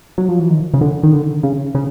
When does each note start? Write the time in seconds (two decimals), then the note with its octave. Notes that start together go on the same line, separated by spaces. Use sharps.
0.18 F#3
0.29 F3
0.39 E3
0.51 D#3
0.74 C#3
0.81 D3
1.03 D#3
1.12 D3
1.43 C#3
1.75 C#3